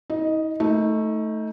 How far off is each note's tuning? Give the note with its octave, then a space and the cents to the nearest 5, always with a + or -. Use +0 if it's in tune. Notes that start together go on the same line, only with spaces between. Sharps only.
D#4 +45 D#5 +0
A3 +0 D#4 +25